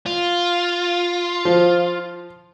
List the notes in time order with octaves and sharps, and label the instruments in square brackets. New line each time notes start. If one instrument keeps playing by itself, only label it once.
[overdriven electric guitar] F4
[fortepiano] F3